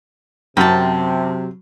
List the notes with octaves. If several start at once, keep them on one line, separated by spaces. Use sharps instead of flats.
F#2 C3 F#3 G5 A5